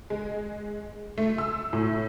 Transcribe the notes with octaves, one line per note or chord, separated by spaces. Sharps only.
G#3
A3
E6
A2